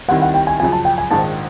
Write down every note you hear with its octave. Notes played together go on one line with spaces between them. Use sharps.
D#2 D#3 G3 C4 E4 F#5
F#5
G5
G#5
F#2 C#3 F3 G#5
A5
G5
G#5
A#1 G#2 D#3 A5